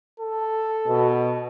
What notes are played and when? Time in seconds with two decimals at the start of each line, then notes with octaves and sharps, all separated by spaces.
0.20 A4
0.85 B2